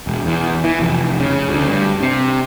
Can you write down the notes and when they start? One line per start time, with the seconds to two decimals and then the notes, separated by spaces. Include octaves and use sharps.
0.07 E1
0.26 E2
0.64 E3
0.80 F1
1.20 C#3
1.49 D2
1.68 G2
2.02 C3